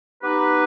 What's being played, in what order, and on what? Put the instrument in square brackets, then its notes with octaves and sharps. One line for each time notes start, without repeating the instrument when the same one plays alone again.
[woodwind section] B3 D#4 G4 B4